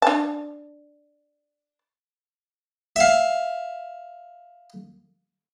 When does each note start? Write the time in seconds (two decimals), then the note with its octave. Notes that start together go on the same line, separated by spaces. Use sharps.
0.02 D4 A5
2.96 E5 F5